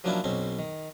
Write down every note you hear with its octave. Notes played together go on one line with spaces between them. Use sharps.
F3 F#3 A#3 C#4 D4 E4
B1 B2 C4 C#4
D#3